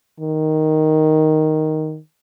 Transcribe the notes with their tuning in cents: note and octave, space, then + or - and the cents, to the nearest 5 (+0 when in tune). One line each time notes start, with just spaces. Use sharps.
D#3 +0